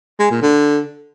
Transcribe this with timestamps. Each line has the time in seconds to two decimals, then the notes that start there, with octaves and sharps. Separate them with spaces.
0.19 G#3
0.31 A#2
0.42 D3